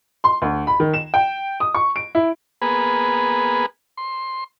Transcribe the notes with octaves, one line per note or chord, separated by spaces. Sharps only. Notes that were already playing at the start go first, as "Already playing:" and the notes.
C6
D2
B5
D#3
E7
G5
D#6
C#6
D7
E4
A#3 B3 G#4 B4
C6